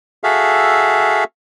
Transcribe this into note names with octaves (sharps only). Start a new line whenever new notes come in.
F#4 G#4 A4 E5 F5